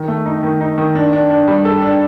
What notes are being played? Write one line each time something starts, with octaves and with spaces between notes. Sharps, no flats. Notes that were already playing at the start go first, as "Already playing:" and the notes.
Already playing: D#3
A3
D#4
D#3
D#4
D#3
D4
D4
D4
G3
A4
D4